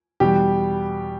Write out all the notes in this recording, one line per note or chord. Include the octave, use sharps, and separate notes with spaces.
E2 B2 G3 G4